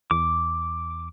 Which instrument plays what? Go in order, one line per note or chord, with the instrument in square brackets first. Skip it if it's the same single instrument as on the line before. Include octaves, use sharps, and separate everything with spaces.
[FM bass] E2 [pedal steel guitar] D6